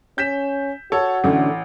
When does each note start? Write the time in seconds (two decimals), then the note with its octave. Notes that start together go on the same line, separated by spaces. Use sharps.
0.18 C#4 G6 B6 E7
0.92 F#4 A4 C#5
1.24 A1 D3 A3 C#4